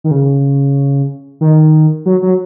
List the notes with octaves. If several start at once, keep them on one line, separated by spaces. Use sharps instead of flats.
D#3
C#3
D#3
F#3
F#3